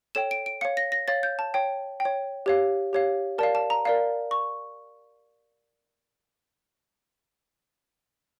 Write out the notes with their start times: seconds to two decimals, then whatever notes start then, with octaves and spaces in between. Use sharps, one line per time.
0.15 A4 C#5 G5 E7
0.31 D7
0.46 D7
0.61 C#5 F5 C#7
0.77 A#6
0.92 A#6
1.08 C#5 F5 A6
1.23 G6
1.39 A5
1.54 C#5 G5
2.00 G5
2.05 C#5
2.46 G4 C#5 F5
2.93 G4 C#5 F5
3.38 A#4 D5 F5 A5
3.55 A5
3.70 A#5
3.85 A#4 D5 F5
4.31 C#6